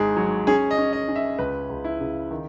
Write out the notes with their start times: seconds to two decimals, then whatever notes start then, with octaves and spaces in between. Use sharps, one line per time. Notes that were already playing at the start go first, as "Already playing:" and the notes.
Already playing: G#1 G#2 G#4
0.16 F#3
0.47 C#4 G#4
0.71 D#5
0.78 C#4
0.93 D#5
1.08 C#4
1.16 E5
1.39 C#2 B4
1.70 C#2
1.84 E4
2.01 C#3
2.31 D#3